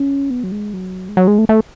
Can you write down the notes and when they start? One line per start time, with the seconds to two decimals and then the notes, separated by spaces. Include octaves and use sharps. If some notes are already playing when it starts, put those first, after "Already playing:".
Already playing: C#4
0.30 B3
0.43 F#3
0.52 G#3
0.73 F#3
1.09 G#3
1.17 F#3
1.28 G#3
1.38 A3
1.49 A3